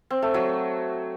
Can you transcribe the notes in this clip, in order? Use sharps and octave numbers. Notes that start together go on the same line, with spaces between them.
C4
A3
F#3